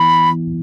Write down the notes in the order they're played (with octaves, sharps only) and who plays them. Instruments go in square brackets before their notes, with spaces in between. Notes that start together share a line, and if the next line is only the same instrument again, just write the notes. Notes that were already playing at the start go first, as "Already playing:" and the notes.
Already playing: [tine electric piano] E3 B3 E4 [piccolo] B5